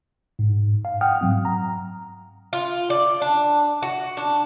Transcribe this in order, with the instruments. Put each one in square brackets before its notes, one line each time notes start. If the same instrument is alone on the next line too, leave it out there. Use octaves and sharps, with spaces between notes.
[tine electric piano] G#2
F5
F#5 G5 D#6 F6
G#2 F#3 C4
A#5
[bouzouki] F4
D5
D4
F#4
D4